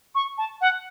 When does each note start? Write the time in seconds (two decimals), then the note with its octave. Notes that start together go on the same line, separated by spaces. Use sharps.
0.15 C#6
0.38 A5
0.61 F#5